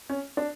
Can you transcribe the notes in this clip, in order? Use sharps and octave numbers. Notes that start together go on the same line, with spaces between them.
C#4
D4